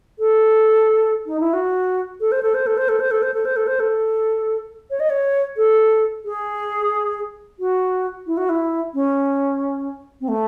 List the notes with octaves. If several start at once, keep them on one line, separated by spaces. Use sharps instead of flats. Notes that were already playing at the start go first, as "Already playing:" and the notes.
A4
D#4
E4
F#4
A4
C5
A4
C5
A4
C5
A4
C5
A4
C5
A4
C5
A4
C5
A4
C#5
D#5
C#5
A4
G#4
F#4
E4
F#4
E4
C#4
C4
A3